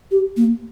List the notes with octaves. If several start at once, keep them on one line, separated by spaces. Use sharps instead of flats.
G4
A#3